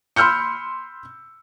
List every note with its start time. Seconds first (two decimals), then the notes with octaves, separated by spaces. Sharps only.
0.16 B5 C6 E6 F6 G6 C#7